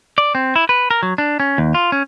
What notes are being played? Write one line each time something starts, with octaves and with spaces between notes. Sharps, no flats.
D5
C4
E4
B4
A#4
F#3
D4
C#4
D#2
F4
C#4